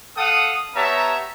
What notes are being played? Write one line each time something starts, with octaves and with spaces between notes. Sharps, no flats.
A4 F5 F#5 D#6
B3 G4 C#5 E5 A5 A#5